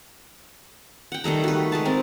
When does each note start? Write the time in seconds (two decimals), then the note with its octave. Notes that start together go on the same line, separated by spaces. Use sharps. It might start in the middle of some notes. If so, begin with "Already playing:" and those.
1.12 F#5 G5
1.24 D#3 G3 A3 A#5
1.44 F#4 B4
1.72 G#3 B4 A5
1.85 C4 A#4